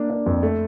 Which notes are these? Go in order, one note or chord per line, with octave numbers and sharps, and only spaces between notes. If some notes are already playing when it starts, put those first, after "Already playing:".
Already playing: A#3 D4
D4
F2
A3